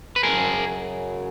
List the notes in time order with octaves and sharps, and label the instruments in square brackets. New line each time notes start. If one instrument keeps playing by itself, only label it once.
[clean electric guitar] B4
[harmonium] F#2 C#3 F#3 [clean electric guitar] G#4 A#4